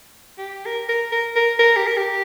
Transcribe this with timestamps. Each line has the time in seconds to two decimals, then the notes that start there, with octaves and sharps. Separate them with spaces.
0.38 G4
0.66 A#4
0.89 A#4
1.12 A#4
1.36 A#4
1.59 A#4
1.77 G4
1.87 A#4
1.97 G4